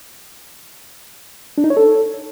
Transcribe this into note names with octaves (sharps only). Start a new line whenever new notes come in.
D4
D#4
C#5
A4